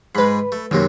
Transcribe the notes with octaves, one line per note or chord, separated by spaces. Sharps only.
G#2 G#3 B4 B5
A3
F#2 C3 D#3 F#3 A#3